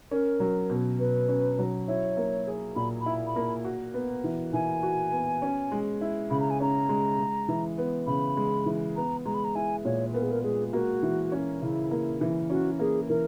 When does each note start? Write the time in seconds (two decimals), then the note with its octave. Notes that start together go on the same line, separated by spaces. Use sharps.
0.11 C#4 A#4
0.40 F#3
0.70 B2
0.99 B2 B4
1.28 C#4
1.59 F#3
1.88 E4 C#5
2.17 A#3
2.47 G#4
2.76 A#2 B5
3.01 B5
3.06 E4
3.27 B5
3.36 A#3
3.65 F#4
3.94 B3
4.24 E3
4.54 E3 G#5
4.83 F#4
5.12 B3
5.42 C#4
5.72 G#3
6.01 E4
6.30 C#3 B5
6.40 A#5
6.50 G#5
6.60 C#4 A#5
6.89 G#3
7.19 G#3
7.48 E3
7.78 B3
8.07 C#3 B5
8.37 G#3
8.66 E3
8.96 B3 A#5
9.26 G#3 A#5
9.34 B5
9.44 A#5
9.55 E4 G#5
9.85 A#2 C#5
10.14 B3 A#4
10.23 G#4
10.31 A#4
10.43 G#3 G#4
10.73 A#3 F#4
11.03 E3
11.32 C#4
11.62 C#3 E4
11.91 A#3
12.21 E3
12.50 C#4 F#4
12.79 A#3 G#4
13.09 E3 A#4